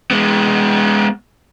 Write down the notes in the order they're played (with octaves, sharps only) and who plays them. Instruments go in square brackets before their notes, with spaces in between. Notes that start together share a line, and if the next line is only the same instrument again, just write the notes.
[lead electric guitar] G#3 B3